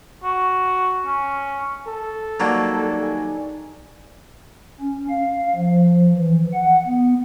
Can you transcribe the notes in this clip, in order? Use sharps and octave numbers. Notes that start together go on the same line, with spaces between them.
F#4
C#4
A4
D#3 F#3 G3 A#3 D4
G#5
C#4
F5
F3
E3
F#5
B3